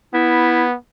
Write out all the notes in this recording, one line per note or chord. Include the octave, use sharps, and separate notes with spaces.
B3 E4